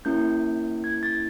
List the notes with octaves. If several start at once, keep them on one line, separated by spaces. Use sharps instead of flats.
A#3 C#4 E4 G6
G#6
A6